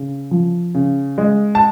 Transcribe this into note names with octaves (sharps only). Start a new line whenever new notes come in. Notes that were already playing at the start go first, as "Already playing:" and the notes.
Already playing: C#3
F3
C#3
G#3
A5